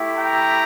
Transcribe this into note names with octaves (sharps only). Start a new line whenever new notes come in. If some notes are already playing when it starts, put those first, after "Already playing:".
Already playing: A3 E4 G4
G5 A#5